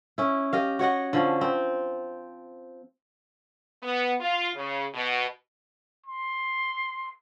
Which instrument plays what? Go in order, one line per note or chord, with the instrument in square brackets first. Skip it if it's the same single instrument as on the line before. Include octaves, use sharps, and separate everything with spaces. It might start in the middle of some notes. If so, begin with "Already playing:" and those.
[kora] C#4 E4
G4 D#5 F5
F#4 C#5 D#5 F#5
D3 F3 C#4
C4
[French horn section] B3
F4
C#3
B2
[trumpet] C6